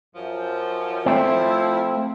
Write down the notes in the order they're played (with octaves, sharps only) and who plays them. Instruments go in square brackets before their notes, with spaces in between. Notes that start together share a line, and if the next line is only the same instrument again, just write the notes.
[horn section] F#2 F3
[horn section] F3 E4 [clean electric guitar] A3 C4